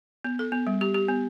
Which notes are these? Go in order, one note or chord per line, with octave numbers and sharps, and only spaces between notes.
B3
A4
B3
G3
G4
G4
B3